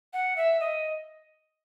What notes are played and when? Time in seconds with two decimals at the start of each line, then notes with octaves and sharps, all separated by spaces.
0.13 F#5
0.36 E5
0.60 D#5